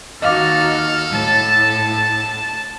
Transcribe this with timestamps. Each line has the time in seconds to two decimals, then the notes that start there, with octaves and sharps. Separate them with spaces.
0.22 D#2 D#4 F#4 A4 D#5 F5 D6 F6
1.12 A2 A5